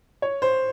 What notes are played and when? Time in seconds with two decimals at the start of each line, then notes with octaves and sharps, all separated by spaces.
0.22 C#5
0.42 C5